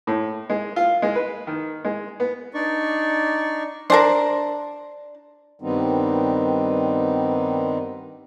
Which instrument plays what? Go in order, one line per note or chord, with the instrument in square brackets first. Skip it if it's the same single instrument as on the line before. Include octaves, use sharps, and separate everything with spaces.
[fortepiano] A2
G#3
F4
G#3
B4
D#3
G#3
B3
[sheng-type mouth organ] D4 D#4 D5 C#6
[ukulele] D4 A5 [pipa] A#4 C5
[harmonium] G2 D#3 G3 B3 C4 D#4